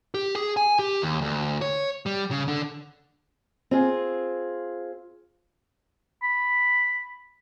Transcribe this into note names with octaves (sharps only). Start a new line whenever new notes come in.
G4
G#4
G#5
G4
D#2
D2
C#5
G3
C#3
D3
C4 F4 G#4
B5